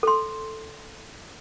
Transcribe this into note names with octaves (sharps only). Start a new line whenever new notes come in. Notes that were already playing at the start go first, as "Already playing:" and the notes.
A4 C6